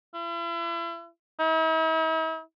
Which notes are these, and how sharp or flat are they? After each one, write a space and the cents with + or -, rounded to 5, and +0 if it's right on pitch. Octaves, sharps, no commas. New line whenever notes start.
E4 +40
E4 -45